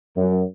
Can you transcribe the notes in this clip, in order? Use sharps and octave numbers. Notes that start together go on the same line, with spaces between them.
F#2